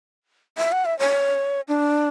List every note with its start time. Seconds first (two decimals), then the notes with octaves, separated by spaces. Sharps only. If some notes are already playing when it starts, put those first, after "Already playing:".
0.58 E5
0.72 F#5
0.85 E5
0.99 C#5
1.68 D4